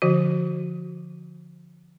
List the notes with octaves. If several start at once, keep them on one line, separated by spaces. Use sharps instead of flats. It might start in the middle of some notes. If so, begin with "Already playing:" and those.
D3 F3 F#4